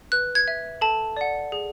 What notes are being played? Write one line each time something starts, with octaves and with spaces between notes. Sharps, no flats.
B4 F#6
G#6
E5
A4 A5
D5 F#5
G#4